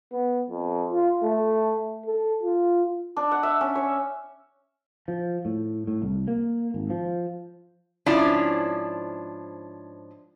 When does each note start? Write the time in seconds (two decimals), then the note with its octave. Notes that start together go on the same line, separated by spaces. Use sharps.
0.12 B3
0.50 F2
0.92 F4
1.23 A3
2.06 A4
2.43 F4
3.17 D4
3.31 F#5
3.43 E5
3.61 C#4
3.75 C#5
5.08 F3
5.45 A2
5.87 A2
6.02 C2
6.28 A#3
6.74 G#1
6.90 F3
8.06 G#2 F3 C#4 D4 E4